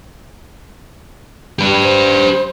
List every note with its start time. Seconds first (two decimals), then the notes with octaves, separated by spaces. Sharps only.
1.59 G3 G4 B4
1.82 C5